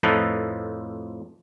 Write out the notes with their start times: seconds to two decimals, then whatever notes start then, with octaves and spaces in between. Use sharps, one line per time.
0.03 F2 A2 F3 D#4 A4 B4